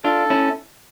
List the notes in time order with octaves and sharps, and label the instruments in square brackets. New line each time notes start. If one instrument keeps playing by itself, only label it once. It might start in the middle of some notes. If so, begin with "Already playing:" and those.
[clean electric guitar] D4 F4 [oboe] A4
[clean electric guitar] C#4 E4